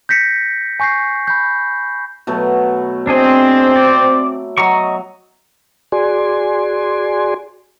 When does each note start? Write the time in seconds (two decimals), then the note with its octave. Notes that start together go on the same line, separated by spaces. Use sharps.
0.09 G6 A#6 B6 C#7
0.80 G#5 C#6 G6 A#6 C7
1.28 B5 G6
2.27 B2 F#3 A3
3.07 C4 D4 G#4 D#5
3.76 D5
4.58 F#3 D#5 A#5 C#6
5.92 F#4 G#4 D5 G#5 C6